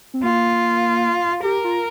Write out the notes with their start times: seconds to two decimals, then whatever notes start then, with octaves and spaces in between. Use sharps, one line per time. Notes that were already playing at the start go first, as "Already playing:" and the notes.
0.14 C4
0.23 A#3 F4
1.44 G4 A#4
1.64 F4